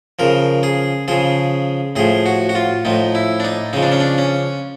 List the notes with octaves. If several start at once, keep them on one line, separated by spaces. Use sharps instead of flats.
C#3 F3 A#4
G#4
C#3 F3 G#4
A2 F3 G#4
F#4
F#4
F4
A2 F3 D#4
E4
D4
D#4
C#3 F3 D#4
D4
C#4
D4
C#4